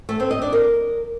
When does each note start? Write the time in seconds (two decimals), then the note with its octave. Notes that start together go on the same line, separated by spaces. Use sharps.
0.09 A3
0.20 C4
0.31 D#5
0.42 D4
0.53 A#4